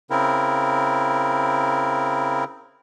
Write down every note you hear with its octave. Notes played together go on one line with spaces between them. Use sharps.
C#3 C4 E4 A#4